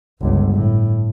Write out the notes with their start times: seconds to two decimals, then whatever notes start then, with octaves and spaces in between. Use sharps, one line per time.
0.21 G1 C#2
0.52 A2